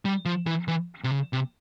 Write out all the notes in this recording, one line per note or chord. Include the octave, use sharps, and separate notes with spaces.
G3
F3
E3
E3
C3
C#3
C3